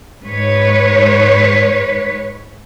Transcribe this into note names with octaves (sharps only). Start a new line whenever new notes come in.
G#2 B4 C#5